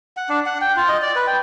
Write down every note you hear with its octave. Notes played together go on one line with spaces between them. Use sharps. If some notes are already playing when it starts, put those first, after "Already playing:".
F#5
D4
F#5
G5
F4
D#5
D5
B4
G5